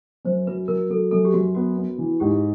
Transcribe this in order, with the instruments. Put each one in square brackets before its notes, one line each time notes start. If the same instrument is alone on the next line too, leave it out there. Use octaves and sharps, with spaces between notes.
[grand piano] F#2 [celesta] C5
[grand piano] F#3 [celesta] B4
[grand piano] F#3 [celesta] A#4
[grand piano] F#3 [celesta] A4
[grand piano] F#2 [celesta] A4
[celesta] G4
[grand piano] F#2 [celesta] F#4
[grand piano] B3 [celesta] F#4
[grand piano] B3
E3
[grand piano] G#2 [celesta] G4